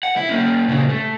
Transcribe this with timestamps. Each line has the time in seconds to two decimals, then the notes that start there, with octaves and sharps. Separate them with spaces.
0.03 F#5
0.17 E4
0.29 A#3 C#4
0.68 A#2 C#3
0.89 A3